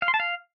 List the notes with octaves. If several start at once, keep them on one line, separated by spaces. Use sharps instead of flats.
F5
C6
A5
F5